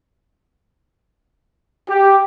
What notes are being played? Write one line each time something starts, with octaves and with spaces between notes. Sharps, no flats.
G4